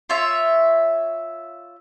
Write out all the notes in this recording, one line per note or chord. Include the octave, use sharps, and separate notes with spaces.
F4 C#5 E5